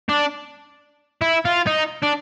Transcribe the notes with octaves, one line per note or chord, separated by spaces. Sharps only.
D4
E4
F4
D#4
D4